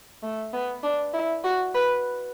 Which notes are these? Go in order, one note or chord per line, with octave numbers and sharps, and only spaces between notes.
A3
B3
D4
E4
F#4
B4